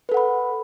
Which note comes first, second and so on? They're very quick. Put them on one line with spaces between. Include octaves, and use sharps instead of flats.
B4 A4 F#5 B5